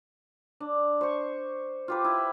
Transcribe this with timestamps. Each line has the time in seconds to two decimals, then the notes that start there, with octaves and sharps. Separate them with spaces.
0.60 D4
1.01 C5 C#6
1.88 F4 G4 B4
2.04 E4